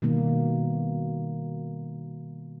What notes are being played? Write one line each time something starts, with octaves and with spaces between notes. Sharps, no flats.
B2 D#3 G3 A#3